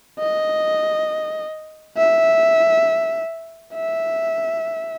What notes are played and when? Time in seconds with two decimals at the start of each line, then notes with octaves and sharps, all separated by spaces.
0.19 D#5
1.97 E5
3.74 E5